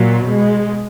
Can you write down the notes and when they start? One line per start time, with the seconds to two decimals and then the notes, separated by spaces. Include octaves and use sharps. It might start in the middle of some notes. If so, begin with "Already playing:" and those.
Already playing: A#2 F#3
0.27 B2 G#3